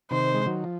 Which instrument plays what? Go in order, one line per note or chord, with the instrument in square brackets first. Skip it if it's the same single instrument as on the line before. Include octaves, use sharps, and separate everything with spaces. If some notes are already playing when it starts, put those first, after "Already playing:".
[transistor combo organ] C3 D#3 [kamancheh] C5
[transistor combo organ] G#3
D#3 F#3
F3